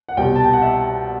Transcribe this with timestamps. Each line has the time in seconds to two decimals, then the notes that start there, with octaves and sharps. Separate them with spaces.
0.09 F#5
0.17 C2 B2 G3 G5
0.36 A5
0.44 G5
0.53 F#5
0.62 E5